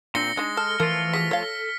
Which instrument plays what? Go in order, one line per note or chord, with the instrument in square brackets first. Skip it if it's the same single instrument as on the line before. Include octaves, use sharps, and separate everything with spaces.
[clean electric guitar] A#2 C4 [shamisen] D4 [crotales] A#6 C#7 G7
[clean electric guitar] G#3 [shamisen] D4 D#4
[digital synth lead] A4 [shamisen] A5 [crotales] F6
[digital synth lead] E3 [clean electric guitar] F3 A3 F4 [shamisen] A#4 [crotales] F6
[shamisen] F#4 G#4 [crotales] B6
[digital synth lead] A4 [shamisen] C#5 F5